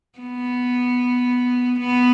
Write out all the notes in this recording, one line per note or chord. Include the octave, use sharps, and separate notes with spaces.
B3
B3